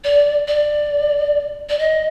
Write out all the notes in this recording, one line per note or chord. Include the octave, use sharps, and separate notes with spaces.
D5
D5
D5
D#5